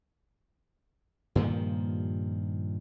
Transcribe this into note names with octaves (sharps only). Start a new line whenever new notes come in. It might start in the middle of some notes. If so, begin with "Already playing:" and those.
G2 A#2 D#3 F3